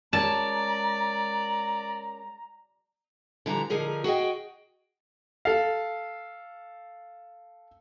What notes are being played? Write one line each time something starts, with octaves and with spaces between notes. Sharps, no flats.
G#3 C#4 A#4 D5 A5 A#5
D3 E3 F3 G3 F5 A#5
D3 F3 D#4 G#4 A#4
F#4 G#4 D#5 G5
A4 F5